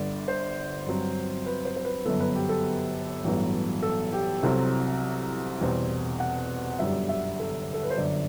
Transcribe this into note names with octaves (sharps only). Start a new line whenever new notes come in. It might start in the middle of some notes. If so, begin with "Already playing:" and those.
Already playing: G1 G2 D3 D5
C5
G2 F#3 C4
B4
C5
C5
B4
G1 F#2 F#3 B3 A4
B4
G4
A4
A1 G2 F#3 B3
A4
G4
C2 C3 F#3 C4 A4
E2 B2 G3 C4
F#5
G1 F#2 D3 G3 E5
E5
A4
A4
B4
C5
G1 F#2 D3 D5